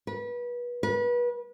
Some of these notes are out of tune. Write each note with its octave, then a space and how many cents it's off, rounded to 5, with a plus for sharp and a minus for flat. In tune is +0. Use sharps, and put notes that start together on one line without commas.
B4 -30
B4 -30